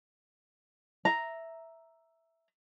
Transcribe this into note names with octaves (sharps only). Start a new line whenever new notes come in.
E5 A#5